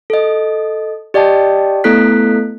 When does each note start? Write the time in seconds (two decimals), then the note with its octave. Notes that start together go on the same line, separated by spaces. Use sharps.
0.10 A4 D#5
1.14 G4 D5 D#5 G5 A5
1.84 A3 B3 E4 A4 F#6 B6